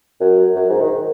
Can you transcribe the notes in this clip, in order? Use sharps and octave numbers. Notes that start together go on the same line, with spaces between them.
F#2
F#2
G#2
D#3